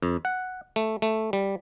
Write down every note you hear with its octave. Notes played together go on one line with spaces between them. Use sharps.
F2
F#5
A3
A3
G3